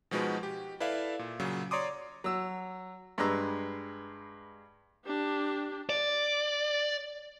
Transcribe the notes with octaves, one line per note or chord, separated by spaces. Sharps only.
B2 F3 G#3 D#4 F#4 B4
G4
E4 A4 B4 D5 E5 F5
A#2
A#2 C#3 F#3
C#5 D5 A#5 C6 D6 D#6
F#3 E6
G2 G#3 B4 A#5 E6
D4 G4
D5